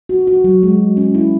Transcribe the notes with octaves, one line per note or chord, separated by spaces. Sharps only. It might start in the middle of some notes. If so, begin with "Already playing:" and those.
F#4
F#4
F#3
G#3
C#4
E4